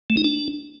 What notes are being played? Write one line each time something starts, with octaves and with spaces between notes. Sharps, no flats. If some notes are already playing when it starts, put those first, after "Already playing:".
A3
D#4
D4